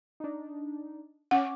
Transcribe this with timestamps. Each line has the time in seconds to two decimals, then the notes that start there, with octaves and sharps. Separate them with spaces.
0.20 D4 D#4
1.31 C#4 F#5 D6